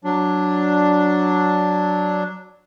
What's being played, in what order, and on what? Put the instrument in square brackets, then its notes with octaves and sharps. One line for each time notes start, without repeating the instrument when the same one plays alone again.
[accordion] F#3 D4